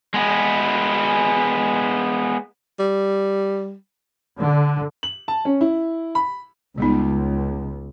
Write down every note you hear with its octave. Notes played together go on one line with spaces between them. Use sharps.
G#3 B3
G3
D3
F#7
A5
C#4
E4
B5
C#2 G3 B3 D#4